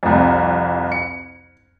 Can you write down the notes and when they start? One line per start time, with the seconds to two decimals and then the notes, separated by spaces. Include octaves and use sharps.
0.03 C2 F2
0.92 C#7